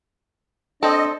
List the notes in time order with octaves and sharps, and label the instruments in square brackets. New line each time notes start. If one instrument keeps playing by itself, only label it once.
[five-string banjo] C4 A4 [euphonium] D4 [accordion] D#5